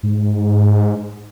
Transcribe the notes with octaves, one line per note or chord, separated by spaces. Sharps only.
G#2